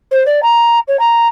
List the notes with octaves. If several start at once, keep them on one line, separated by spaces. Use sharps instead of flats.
C5
D5
A#5
C#5
A#5